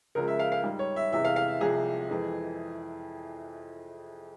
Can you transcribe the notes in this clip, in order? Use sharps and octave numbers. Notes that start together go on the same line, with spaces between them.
C#2 C#3 F3 G#3 A#4
E5
F5
F5
G#2 G3
C#5
E5
E2 C3 E3 G#3 E5
F5
F5
E5
C2 C3 F3 G#3 G#4
F2 E3 G#3